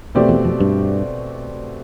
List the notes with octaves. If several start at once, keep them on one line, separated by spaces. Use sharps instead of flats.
E2 B2 A3 C4 G4 D5
E2
F2
G2